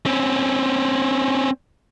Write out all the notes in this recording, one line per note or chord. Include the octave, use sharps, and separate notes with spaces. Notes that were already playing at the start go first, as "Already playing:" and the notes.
C4 C#4